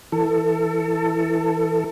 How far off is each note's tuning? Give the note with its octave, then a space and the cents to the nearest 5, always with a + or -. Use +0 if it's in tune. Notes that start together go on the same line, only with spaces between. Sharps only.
E3 +0 A4 +25